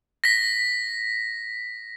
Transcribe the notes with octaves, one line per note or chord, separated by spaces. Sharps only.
A#6 B6